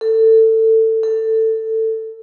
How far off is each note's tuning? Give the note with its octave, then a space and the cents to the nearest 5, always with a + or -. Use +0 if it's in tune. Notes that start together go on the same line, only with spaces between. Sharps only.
A4 +20
A4 +15